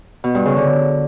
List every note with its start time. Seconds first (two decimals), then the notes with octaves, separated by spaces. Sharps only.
0.24 B2
0.35 G2
0.45 C#3
0.56 D3